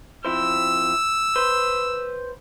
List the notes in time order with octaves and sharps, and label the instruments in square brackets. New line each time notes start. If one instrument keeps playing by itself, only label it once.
[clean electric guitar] F2 E4 C5 [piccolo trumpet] E6
[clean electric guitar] B4 C5